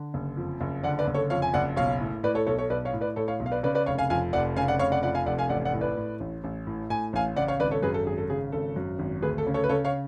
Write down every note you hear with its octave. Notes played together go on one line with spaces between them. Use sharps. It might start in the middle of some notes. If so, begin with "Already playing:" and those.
Already playing: D3
F#1
F2
F#1
D3 D5 F#5
B4 D5
F#1
A4 C#5
F2 C#5 F5
G#5
F#1 D5 F#5
B1 C#5 F5
A2
A2 B4 D5
A4 C#5
B1 A4 C#5
A4 C#5
B1 B4 D5
C#5 F5
A2
B4 D5
A2 A4 C#5
C#5 F5
B1
F5
B4 D5
C#3 B4 D5
B4 D5
F1 C#5 F5
F5 G#5
F2 F5 G#5
F1 D5 F#5
C#3 F5 G#5
D5 F#5
F1 C#5 F5
D5 F#5
F2 D5 F#5
F5 G#5
F1 D5 F#5
F5 G#5
A1 D5 F#5
D5 F#5
A2
B4 D5
A2
A1
A1
A2
A2 G#5
A1 F5 G#5
C#3 D5 F#5
C#5 F5
G#1 B4 D5
A4 C#5
F#2 G#4 B4
A4
G#1 G#4
A4
C#3 G#4
G#1 A4
F#2
G#1
D2 G#4 B4
A4
C#3
A4 C#5
B4
C#3 A4 C#5
C#5 F5